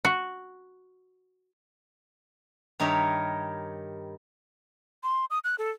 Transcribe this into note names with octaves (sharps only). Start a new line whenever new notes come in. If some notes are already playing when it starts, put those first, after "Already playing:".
F#4
G2 D#3 D#4 A#4 C#5 E5
C6
D#6
F#6
A4